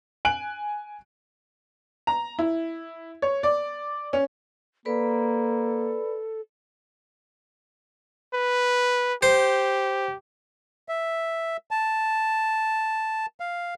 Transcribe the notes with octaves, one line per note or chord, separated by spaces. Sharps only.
G#5 F#6 D7 F#7
A#5
E4
C#5
D5
C#4
A#3 A4 B4 D5 B5
B4
G4 C5
E5
A5
F5